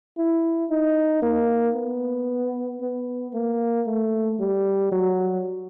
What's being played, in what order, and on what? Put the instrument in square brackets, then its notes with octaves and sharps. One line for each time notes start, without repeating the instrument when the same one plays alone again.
[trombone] E4
D#4
A#3
B3
B3
A#3
A3
G3
F#3